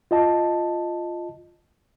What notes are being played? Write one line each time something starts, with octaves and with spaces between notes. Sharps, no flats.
F4 D#5 A5